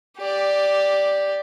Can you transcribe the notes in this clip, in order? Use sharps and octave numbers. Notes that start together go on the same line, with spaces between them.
G4 D5